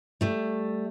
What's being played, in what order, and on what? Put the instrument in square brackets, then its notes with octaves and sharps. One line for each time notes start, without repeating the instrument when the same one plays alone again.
[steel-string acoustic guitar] G3 A3